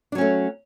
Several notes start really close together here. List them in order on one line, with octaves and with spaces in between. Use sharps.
D4 F#3 C#4 A3